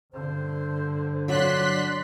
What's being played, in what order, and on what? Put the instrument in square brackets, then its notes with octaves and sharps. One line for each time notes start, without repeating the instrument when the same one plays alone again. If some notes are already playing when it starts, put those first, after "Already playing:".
[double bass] G2 D3 [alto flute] C5
[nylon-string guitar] F#3 D4 F#4 [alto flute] D5 [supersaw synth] C6 F#6 B6